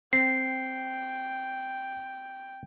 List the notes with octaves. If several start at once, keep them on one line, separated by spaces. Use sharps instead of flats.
C4 G5 C7